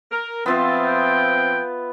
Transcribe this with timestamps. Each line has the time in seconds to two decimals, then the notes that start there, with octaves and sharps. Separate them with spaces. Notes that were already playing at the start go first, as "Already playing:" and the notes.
0.12 A#4
0.46 F3 B3 C4 F4 E5
0.87 G5